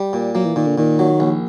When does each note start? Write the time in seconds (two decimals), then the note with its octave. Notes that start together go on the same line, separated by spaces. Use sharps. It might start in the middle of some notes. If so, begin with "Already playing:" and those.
Already playing: G3
0.13 A#2
0.35 F#3 A#3
0.46 E3
0.56 A#2 D#3
0.67 D3
0.78 A#2 D#3
0.99 F#3
1.20 A#1